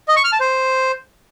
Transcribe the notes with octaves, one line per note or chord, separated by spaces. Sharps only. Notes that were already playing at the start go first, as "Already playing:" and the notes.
D#5
C#6
F6
A5
C5